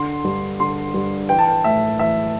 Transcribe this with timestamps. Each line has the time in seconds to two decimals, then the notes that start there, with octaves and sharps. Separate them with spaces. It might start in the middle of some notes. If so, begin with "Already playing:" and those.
Already playing: D3 C6
0.24 G2
0.60 D3 C6
0.94 G2
1.29 E3 G5
1.39 A5
1.48 G5
1.64 A2 E5
1.99 E3 E5